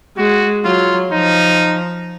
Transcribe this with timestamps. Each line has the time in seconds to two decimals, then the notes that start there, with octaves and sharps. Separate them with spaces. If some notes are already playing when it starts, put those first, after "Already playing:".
0.18 G#3 F#4
0.65 F#3 F4
1.12 F3 D#4